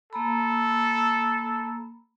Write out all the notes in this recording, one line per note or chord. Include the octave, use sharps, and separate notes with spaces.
A#3 A4 A#5 B5